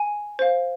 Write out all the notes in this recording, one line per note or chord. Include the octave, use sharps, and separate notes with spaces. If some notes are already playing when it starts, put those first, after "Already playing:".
Already playing: G#5
C5 F5